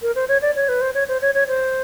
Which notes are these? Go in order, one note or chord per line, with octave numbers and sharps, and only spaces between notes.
A#4
C5
C#5
D5
C#5
B4
C5
C#5
C5
C#5
C#5
C5